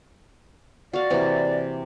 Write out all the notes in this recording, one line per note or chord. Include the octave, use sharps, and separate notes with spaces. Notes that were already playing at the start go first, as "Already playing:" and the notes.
F#4 D5 F5
C3 E3 A#3